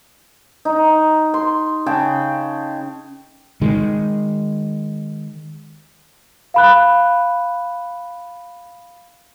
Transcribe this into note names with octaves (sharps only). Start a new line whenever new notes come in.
D#4
C6
C#3 G5 A5
D#3 G#3
F5 B5 F#6